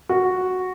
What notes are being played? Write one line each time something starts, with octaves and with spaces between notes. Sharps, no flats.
F#4